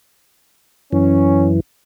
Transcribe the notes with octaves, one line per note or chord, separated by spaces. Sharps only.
F#2 E3 C#4